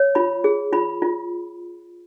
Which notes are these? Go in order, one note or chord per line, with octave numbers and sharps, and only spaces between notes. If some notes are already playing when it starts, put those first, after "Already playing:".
Already playing: C#5
F4 B5
G#4
F4 B5
F4